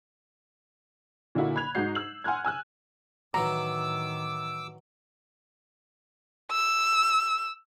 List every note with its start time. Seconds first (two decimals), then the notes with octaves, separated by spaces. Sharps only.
1.35 A#2 D3 A#3 E4 F#4
1.56 B5 F#6 G#6 F7
1.75 G#2 D#4 F#4 G6 C7
1.95 E6 F#7
2.24 F#5 G#5 C6 F6 F#6 G#6
2.45 G#5 E6 F#6
3.34 A2 D#3 E3 F#3 A#5 D6 E6
6.52 E6